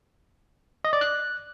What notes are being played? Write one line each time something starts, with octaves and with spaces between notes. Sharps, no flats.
D#5
D5
F#6